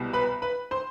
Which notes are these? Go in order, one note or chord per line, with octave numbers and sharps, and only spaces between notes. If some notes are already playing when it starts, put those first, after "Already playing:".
Already playing: C2 B2 G3
B4 B5
B4 B5
C5 C6